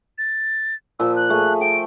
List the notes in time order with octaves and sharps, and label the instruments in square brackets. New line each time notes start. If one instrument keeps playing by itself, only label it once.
[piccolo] A6
[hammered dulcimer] A#2 F3 [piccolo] E6
[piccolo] F#6
[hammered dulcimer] A3 G#4
[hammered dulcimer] G5 [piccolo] D7